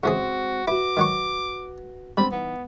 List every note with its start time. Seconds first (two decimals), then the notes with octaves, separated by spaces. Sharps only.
0.04 C#3 E3 G#3 C4 F#4 G#4 C5
0.68 E4 F#4 B4 D6
0.97 D#3 F#3 C#6
2.17 G3 B3 C4 D4 B5
2.32 E3 B3 D#4